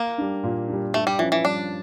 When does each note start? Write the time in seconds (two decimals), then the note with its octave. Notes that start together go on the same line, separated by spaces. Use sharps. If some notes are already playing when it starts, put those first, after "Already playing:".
Already playing: A#3
0.18 G3 D4
0.43 A#2
0.68 G3 D4
0.94 G2 A3
1.07 G3
1.19 E3 F3 C#4
1.32 E3
1.45 G2 D4